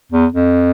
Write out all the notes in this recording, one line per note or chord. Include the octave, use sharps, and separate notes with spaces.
E2
F2